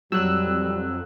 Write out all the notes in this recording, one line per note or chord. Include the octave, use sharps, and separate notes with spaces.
F2 F#3 G3 E6 F#6